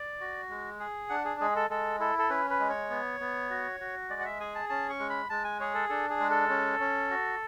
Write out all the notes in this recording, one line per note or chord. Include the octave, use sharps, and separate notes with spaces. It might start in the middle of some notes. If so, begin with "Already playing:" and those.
Already playing: D5
F#4
G#3
G#4
D4 F#5
G#4
G#3 G#4
A4
G#3 A4
E4 A4
A4
C#4 B4
B4
G#3
C#5
B3
B3
F#4
F#4
G#3 D5
F#5
E5
G#4 G#5
A5
C#4 A5
C#6
G#3
B5
G#3 A5
G#5
G#4 C#5
A4
D4 A4
G#4
G#3
A4
C#4
C#4
F#4